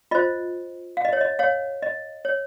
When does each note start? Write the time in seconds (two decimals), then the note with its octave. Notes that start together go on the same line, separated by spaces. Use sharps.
0.11 F4 C5 D#5
0.97 F5
1.05 D#5
1.13 C#5
1.21 D#5
1.39 C#5 F5
1.82 D#5
2.25 C#5